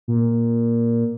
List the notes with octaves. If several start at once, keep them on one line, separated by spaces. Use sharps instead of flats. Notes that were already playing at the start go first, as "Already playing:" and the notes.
A#2